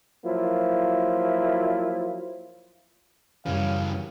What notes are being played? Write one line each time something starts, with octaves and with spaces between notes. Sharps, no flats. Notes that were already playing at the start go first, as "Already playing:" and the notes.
F3 F#3 A#3 E4 F4
F#2 C#3 E3 G3 C#4 F5